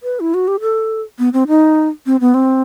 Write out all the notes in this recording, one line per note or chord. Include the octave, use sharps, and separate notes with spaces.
B4
E4
F#4
G4
A4
B3
C4
D#4
C4
B3
C4